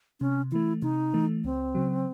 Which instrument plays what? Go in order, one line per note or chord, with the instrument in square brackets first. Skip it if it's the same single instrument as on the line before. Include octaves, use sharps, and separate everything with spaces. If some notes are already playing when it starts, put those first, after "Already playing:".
[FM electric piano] C3 [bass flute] C#4
[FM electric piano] E3 A3 [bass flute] E4
[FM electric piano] C3 [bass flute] D#4
[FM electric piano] E3 A3
[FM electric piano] C#2 [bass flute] C4
[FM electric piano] C#3 F#3